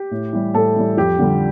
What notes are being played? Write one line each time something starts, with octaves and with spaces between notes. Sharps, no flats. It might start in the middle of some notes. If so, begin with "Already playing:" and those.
Already playing: G4
A2
E3 G3
A2 A4
E3 G3
F2 G4
D3 G3